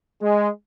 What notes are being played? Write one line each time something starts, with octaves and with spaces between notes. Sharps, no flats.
G#3